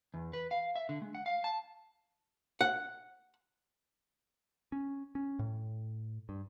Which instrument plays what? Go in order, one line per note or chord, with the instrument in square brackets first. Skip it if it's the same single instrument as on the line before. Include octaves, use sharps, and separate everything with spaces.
[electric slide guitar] E2
B4
F5
E5
D3
G#3
F#5
F5
A5
[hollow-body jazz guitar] F#5
[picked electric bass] C#4
C#4
A2
G2